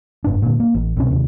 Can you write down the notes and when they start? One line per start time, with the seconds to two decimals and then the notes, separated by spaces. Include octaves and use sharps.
0.24 F#1 G#2 D4
0.42 A#2 D3
0.60 A#3
0.74 A1
0.97 C2 B2 C4 C#4
1.11 D#2 C3